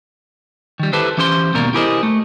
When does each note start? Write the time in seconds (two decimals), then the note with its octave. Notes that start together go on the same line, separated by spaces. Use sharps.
0.80 D#3 G3
0.93 E4 G4 A4 B4 C5
1.17 E3 C#4 G4 C5 B5 C6
1.54 D#2 G#2 B2 A#3 A#4 D5
1.74 E4 G4 G#4 A#4 C5 D#5
2.03 A3